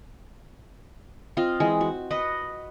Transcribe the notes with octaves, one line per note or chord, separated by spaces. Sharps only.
C4 F4 D#5 F5
E3 G#3
F#4
B4 D#5 F#5